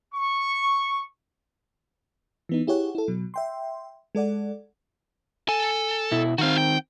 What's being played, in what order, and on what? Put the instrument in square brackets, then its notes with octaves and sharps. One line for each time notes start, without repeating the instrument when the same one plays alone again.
[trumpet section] C#6
[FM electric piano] E3 B3 D#4
E4 G4 G#4 C#5 F#5
E4 A4
B2 F#3
E5 G5 C6
G#3 A4 D5 F#5
[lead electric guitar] A4 [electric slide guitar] G#5
[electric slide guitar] B2 E4
[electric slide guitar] D#3 C4 [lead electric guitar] F#4 F5
[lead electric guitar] G5